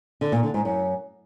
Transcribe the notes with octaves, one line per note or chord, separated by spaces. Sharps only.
D3
A#2
D3
G#2
F#2